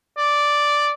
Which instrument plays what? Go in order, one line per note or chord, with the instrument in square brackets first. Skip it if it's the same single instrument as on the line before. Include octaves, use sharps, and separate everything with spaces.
[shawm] D5